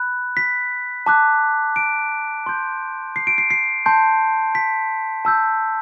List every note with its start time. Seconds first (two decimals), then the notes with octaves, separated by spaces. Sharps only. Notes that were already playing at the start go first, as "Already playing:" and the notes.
Already playing: B5 F#6
0.37 B6
1.06 A5 D6 F#6
1.76 D7
2.46 C6 G6
3.16 C7
3.27 D7
3.38 C7
3.51 C7
3.86 A5 C6 G6
4.55 B6
5.25 A5 E6 G6